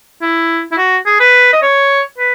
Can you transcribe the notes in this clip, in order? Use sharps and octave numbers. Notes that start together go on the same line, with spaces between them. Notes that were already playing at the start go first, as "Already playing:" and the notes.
E4
E4
F#4
G#4
B4
D#5
C#5
B4